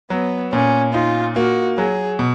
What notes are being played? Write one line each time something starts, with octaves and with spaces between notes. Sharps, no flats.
F#3 B3
A#2 C#4
D#4 F4
A#3 F#4
F#3 G#4
B2